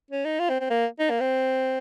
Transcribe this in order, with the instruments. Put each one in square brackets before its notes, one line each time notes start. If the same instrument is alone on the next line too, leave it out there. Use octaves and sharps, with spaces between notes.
[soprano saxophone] C#4
D#4
F4
C4
C4
A#3
D#4
A#3
C4